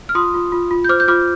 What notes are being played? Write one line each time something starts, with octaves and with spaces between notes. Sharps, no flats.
F6
F4 C6 D#6
F4
F4
F4
G6
C5 D6 F6
G6
F4 D6 F6